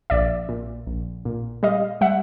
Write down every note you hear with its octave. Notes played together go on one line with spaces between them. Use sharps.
A#1 D5 E5
A#2
A#1
A#2
G3 D#5 F5
G3 E5 F#5